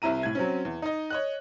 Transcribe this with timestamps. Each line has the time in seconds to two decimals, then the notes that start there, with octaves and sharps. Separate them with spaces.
0.02 C2 C3 E4 A#5 D#7
0.23 A2 G#6
0.35 F#3 C4 C#4
0.65 E2
0.82 D#4 D#5
1.10 C#5 D#5 F#6